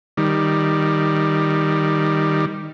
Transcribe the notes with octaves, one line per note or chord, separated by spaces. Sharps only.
D#3 G3